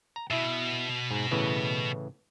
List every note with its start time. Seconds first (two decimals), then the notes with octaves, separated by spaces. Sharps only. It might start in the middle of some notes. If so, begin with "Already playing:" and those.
0.16 A#5
0.31 B2 E4 E5
1.11 G#2
1.31 A2 C#3 E3